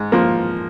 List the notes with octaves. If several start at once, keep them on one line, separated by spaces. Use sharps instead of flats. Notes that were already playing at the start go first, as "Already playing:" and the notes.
Already playing: G#2
F3 A#3